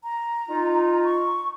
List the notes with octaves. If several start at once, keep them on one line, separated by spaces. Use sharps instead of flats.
A#5
D#4 F4
C#6